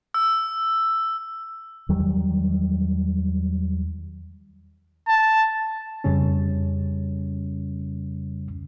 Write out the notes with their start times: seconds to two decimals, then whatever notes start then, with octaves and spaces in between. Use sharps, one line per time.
0.14 E6
1.89 E2 D#3 F#3 G3
5.08 A5
6.04 F2 C#3 G3 C#4